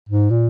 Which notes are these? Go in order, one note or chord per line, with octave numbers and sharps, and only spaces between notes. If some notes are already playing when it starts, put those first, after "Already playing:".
G#2
A#2